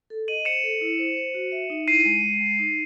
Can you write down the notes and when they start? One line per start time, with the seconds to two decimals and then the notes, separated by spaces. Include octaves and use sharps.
0.10 A4
0.28 D#5 D#7 F#7
0.45 C5 C#7 E7
0.63 A4
0.81 E4
0.99 C5
1.17 C5
1.34 F#4
1.52 E5
1.70 D#4
1.87 E4 C7 D#7
2.05 G#3
2.23 G#3
2.40 G#3
2.59 D#4